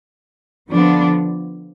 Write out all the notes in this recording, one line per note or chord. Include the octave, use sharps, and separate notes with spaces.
D3 F3 B3 D4